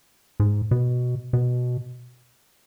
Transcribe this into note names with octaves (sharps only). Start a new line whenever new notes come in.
G#2
B2
B2